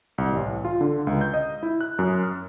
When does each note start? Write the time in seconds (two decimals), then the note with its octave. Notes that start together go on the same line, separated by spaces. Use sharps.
0.18 C2
0.33 A1
0.65 F4
0.81 D3
1.07 C#2
1.21 G6
1.34 D#5
1.63 E4
1.81 F#6
1.99 F#2
2.23 F6